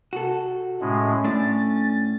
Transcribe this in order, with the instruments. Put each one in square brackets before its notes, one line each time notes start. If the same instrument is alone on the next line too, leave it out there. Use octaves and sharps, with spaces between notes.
[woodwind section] C3 [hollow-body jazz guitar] F#4 A4
[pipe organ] A2 G#3 [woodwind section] C#4
[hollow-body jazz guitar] A2 A3 D4 [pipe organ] A6